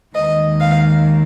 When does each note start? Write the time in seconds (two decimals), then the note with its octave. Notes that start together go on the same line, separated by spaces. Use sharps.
0.14 D#2 D#3 G#3 D#5
0.60 F5